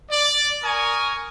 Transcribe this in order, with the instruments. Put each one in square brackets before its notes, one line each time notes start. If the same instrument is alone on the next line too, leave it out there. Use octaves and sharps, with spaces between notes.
[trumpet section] D5
A#4 G#5 C#6 D#6